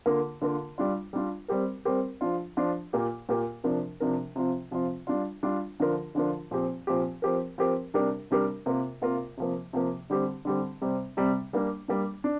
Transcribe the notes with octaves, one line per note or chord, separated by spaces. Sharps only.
D3 A#3 F4 A#4
D3 A#3 F4 A#4
G3 D4 F4
G3 D4 F4
G3 C4 G4 A#4
G3 C4 G4 A#4
F3 D4 F4
F3 D4 F4
A#2 A#3 G4 A#4
A#2 A#3 G4 A#4
C3 F3 D4 A#4
C3 F3 D4 A#4
C3 F3 C4 F4
C3 F3 C4 F4
G3 D4 F4
G3 D4 F4
D3 F3 D4 F4 A#4
D3 F3 D4 F4 A#4
A#2 F3 C4 G4
A#2 F3 C4 G4
F3 C4 G4 A#4
F3 C4 G4 A#4
C3 G3 D4 G4 A#4
C3 G3 D4 G4 A#4
C3 A#3 F4 A#4
C3 A#3 F4 A#4
C3 F3 A#3
C3 F3 A#3
D3 G3 C4 G4
D3 G3 C4 G4
C3 G3 C4
C3 G3 C4
G3 A#3 D4
G3 A#3 D4
D4